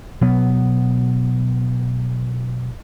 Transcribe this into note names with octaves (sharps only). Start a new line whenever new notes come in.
B2 F#3 B3